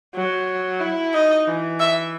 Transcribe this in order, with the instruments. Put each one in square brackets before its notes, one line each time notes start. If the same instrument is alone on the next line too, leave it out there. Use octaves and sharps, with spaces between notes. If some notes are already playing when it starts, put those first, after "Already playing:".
[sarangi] F#3
E4
[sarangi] D#4 [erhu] D#5
[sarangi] E3
[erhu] E5